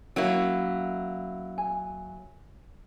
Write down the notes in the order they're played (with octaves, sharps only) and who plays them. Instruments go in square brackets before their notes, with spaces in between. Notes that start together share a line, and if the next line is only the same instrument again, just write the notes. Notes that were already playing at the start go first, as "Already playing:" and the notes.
[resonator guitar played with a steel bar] F#3 A#3 E4 [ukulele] C#4
[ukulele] G#5